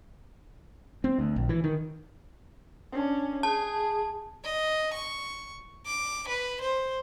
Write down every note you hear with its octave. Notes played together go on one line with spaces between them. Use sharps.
C4
D2
A#1
E3
D#3
C#4 D4
G#4 A5
D#5
C#6
D6
B4
C5